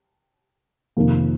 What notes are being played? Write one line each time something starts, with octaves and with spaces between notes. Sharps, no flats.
F2 C3 D#3 A#3